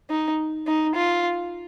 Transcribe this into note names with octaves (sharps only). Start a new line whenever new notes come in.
D#4
D#4
F4